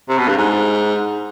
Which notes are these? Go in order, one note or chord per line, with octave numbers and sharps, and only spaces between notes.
C3
B2
G2
G#2